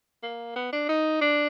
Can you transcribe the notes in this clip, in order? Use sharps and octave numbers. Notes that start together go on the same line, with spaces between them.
A#3
B3
D4
D#4
D4